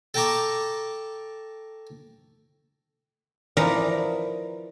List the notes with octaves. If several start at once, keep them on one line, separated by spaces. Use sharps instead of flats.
A4 G5 A5 A#5 C#6 D6
E3 F3 D#4 A#4 D5